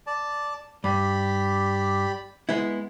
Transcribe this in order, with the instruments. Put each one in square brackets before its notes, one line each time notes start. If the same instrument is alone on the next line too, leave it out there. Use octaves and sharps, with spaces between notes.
[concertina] D5 A5
[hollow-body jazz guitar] G2 [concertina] G4 D5 B5
[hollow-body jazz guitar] G#3 B3 E4